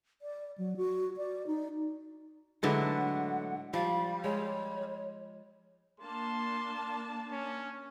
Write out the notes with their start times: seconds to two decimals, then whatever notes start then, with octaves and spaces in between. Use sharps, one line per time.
0.22 D5
0.58 F#3
0.77 F#4
1.17 D5
1.47 D#4
2.63 A2 D3 F#3 G#3 B4 E5 F#5
3.73 F3 G3 F5
4.24 G#3 C#5
6.00 A#3 D4 A5 C6
7.32 C#4